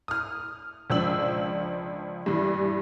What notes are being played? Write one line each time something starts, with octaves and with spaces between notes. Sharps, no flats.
D#6 F6
C#2 F3 D4 E6 F#7
G2 E3